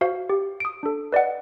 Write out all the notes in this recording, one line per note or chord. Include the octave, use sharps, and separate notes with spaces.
F#4 C5 F5
G4
D#6 D7
D4 A4
B4 D5 D#5 F#5